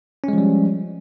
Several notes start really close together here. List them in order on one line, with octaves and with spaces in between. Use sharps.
C#4 G#3 F3 G3